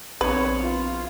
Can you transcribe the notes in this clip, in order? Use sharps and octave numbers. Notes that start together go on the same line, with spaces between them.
A#1 B3 C4 D#4 B4 C#5
F4